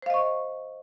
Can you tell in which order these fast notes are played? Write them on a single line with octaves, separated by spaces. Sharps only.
C5 F5 D#5 C#6